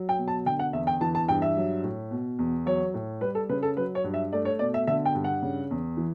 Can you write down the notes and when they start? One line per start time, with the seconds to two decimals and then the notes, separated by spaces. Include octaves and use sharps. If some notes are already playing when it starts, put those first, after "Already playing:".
Already playing: F#3
0.09 G5
0.18 B2
0.28 A5
0.46 D3 G5
0.59 F#5
0.73 E2 E5
0.87 G5
1.01 E3 A5
1.15 A5
1.29 G2 G5
1.42 E5
1.57 F#3
1.83 A2
2.11 B2
2.39 E2
2.66 F#3 C#5
2.94 A2
3.21 G3 B4
3.35 A4
3.49 C#3 B4
3.63 A4
3.77 F#3 B4
3.95 C#5
4.04 G2
4.14 E5
4.33 A3 D5
4.45 C#5
4.59 B2 D5
4.74 E5
4.87 D3 E5
5.05 G5
5.15 G2
5.24 F#5
5.42 C#3
5.71 E2
5.97 E3